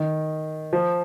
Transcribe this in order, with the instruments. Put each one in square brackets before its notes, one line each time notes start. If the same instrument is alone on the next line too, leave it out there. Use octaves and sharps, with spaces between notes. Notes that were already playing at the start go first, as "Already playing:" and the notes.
Already playing: [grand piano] D#3
F3